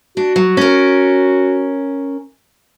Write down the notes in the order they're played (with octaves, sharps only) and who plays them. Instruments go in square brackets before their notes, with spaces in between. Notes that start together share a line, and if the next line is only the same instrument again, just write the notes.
[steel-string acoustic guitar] D4 [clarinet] F#4
[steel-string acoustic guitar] F#3
C#4 A#4